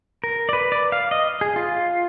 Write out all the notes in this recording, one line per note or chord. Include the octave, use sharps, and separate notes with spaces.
A#4
D5
B4
D5
F5
D#5
G#4
F4